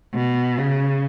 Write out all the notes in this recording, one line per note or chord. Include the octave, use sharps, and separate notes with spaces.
B2
C#3